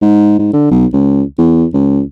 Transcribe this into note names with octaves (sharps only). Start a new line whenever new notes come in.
G#2
G#2
D3
B1
C#2
E2
C#2